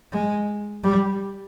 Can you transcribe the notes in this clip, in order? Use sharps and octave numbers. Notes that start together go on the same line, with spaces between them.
G#3
G3